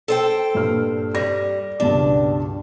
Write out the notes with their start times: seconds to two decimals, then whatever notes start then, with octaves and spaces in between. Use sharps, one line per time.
0.08 A4 C5 G5
0.55 G2 A#2 F6
1.15 G3 A#6
1.80 C#2 G2 B2 D4